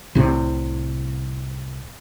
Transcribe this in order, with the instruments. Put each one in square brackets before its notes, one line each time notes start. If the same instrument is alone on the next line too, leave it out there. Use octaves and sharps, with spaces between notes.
[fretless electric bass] C2 A2 C3